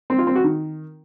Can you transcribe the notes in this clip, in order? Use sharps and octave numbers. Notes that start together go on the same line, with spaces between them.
C4
F4
C4
F#4
D#3